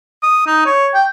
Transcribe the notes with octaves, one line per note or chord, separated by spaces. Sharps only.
D#6
D#4
C#5
G5